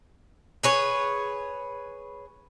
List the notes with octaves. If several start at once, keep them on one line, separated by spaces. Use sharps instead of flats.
G#4 B4 C#5